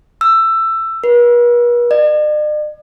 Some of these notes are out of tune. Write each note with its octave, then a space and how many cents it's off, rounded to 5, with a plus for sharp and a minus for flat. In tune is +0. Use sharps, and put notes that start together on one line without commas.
E6 +15
B4 -45
D5 +45